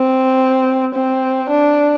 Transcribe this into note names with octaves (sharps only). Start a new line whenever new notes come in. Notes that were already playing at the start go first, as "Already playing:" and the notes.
Already playing: C4
C4
D4